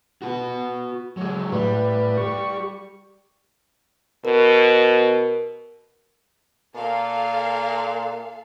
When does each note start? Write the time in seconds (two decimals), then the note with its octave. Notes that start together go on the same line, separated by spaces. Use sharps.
0.22 F#4 B4
1.17 F#3 G#3
1.52 A2 G3 B4
2.17 G4 C#6
4.25 B2 A#4
6.75 A#2 A4 F5